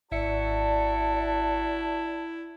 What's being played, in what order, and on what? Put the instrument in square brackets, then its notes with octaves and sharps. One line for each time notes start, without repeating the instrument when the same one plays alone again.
[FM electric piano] G#1 E5 C#7 [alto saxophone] E4 [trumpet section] F#4 A5 [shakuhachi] D5